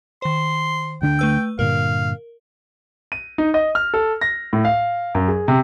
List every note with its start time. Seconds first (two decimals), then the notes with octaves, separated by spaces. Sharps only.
0.22 D#3 C5 C6
1.02 D2 D3 D4 G5
1.19 A3 B4 E6
1.59 G2 A#2 D3 A#4 F5
3.12 D#7
3.38 D#4
3.54 D#5
3.75 F6
3.94 A4
4.21 A#6
4.53 A2
4.65 F5
5.15 F#2
5.28 G#4
5.48 C3